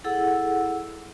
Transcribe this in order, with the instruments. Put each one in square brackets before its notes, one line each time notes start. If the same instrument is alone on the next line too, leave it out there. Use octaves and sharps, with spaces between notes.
[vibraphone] E4 G#4 A4 F#5 E6